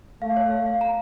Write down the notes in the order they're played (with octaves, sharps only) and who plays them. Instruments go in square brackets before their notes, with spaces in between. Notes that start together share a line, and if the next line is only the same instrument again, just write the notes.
[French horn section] A3 [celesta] F5
[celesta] C#5
F5
F5
A#5